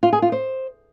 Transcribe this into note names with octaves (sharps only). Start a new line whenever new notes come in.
F4
G#4
F4
C5